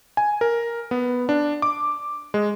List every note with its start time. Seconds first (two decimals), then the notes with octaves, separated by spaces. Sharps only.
0.17 G#5
0.41 A#4
0.91 B3
1.29 D4
1.62 D6
2.34 G#3